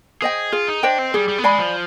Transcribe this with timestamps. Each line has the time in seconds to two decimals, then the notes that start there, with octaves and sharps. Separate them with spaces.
0.22 G#4 C5 D#5 G5
0.52 F4 G#4
0.68 D#4
0.83 D4 C5 D#5 G5
0.99 C4
1.14 G3 G#4
1.28 G3
1.38 B3
1.44 G#3 D5 G#5 B5
1.59 F3